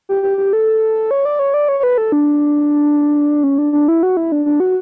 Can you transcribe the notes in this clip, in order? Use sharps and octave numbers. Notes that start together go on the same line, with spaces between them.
G4
G4
G4
A4
C#5
D5
C#5
D5
C#5
C#5
B4
A4
D4
C#4
D4
D4
E4
F#4
E4
D4
D4
F#4